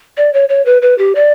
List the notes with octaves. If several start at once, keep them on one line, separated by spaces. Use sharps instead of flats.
D5
C#5
C#5
B4
B4
G4
D5